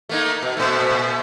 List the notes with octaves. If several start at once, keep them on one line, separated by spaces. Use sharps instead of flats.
A3 A#3 D#4
B2
A#2 A3